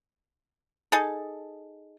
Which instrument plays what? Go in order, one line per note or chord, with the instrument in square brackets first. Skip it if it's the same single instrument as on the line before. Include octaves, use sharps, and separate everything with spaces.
[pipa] D#4 G#4 A4